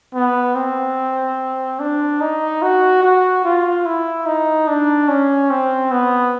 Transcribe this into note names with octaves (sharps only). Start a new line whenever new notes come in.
B3
C4
D4
D#4
F#4
F#4
F4
E4
D#4
D4
C#4
C4
B3